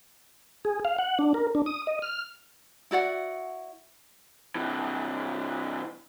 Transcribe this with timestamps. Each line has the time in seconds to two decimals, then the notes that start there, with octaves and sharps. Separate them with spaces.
0.65 G#4
0.85 F5
0.99 F#5
1.19 D4
1.34 A#4
1.55 D4
1.66 D#6
1.87 D#5
2.02 F6
2.91 E4 F#4 D5 F#5
4.55 C3 E3